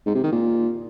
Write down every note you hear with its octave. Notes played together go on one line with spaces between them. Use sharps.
G#2
C3
D#3
A#2